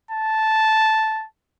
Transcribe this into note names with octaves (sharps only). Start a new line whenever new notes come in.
A5